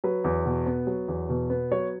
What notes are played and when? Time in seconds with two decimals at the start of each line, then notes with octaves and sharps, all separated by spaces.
0.04 F#3 B4
0.24 E2
0.46 B2
0.66 B3
0.87 F#3
1.08 E2
1.29 B2
1.50 B3
1.72 F#3 C#5